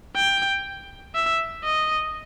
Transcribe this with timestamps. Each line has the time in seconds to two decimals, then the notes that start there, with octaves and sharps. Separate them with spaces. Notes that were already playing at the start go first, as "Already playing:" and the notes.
0.16 G5
1.15 E5
1.65 D#5